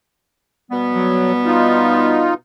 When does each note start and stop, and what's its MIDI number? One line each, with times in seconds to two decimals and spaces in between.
0.71 2.32 47
0.71 2.32 55
0.71 2.32 59
0.93 1.32 54
1.45 2.34 63
1.45 2.34 65